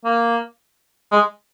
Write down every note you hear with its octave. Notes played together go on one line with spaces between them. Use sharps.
A#3
G#3